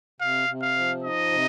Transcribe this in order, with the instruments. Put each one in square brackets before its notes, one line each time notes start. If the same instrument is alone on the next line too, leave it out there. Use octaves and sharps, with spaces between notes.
[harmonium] C3 [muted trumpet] F5
[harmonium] C3
[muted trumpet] F5
[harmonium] F3
[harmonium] D#4 [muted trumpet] D#5
[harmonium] C3